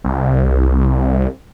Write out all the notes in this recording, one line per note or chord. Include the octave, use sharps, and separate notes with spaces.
C2